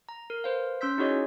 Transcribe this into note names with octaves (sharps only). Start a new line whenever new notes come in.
A#5
A#4
B4 C5 F5
C#4 C6 E6 G6 B6
D#4 E4 F#4 G#4 C#5 D#5